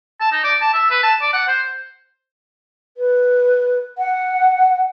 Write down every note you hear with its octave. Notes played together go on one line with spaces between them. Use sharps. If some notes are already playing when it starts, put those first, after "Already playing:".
A5
D#4
D5
A5
E5
B4
A5
D5
F#5
C5
B4
F#5